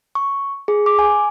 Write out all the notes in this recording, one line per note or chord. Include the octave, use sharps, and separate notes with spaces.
C#6
G#4
D6
G#5